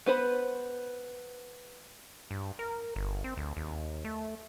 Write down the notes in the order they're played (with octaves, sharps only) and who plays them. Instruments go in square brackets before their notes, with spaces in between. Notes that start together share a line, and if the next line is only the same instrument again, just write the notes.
[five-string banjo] B3 B4 C5 B5
[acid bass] G2
A#4
G1
C4
D2
D#2
A3